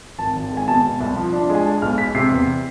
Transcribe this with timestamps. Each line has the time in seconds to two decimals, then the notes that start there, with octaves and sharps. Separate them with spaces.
0.19 G#1 A5
0.36 G#1
0.51 G#3
0.57 G#5
0.68 B2 A5
0.84 B2
1.00 C2
1.16 F3
1.33 D4
1.50 G#3
1.55 G#5
1.66 G#3 A5
1.82 B1 F6
1.98 G#3 B6
2.15 C3 C7
2.31 E2